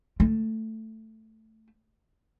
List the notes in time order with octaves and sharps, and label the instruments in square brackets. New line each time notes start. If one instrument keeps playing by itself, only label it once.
[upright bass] A3